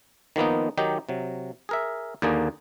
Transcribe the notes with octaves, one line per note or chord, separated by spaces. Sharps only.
D#3 F3 A#3 B3 D#4
D#3 F#3 D#4 G4
C3 F#3
G#4 A#4 E5
D#2 D3 A#3 G#4